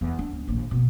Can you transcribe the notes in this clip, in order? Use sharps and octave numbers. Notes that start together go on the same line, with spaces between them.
E2
D4
C#2
A#1 D#3
B2